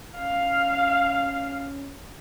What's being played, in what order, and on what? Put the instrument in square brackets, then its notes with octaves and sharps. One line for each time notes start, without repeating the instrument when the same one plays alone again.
[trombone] C#4 [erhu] F5